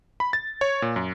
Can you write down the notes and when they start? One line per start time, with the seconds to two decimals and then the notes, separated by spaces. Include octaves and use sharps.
0.20 B5
0.33 A6
0.61 C#5
0.82 A#2
0.96 F#2